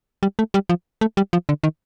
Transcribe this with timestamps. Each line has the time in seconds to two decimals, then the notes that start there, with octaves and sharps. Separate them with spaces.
0.23 G3
0.39 A3
0.54 G3
0.69 F3
1.01 A3
1.17 G3
1.33 F3
1.49 D3
1.64 D#3